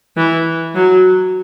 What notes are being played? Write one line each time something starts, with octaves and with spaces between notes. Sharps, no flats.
E3
F#3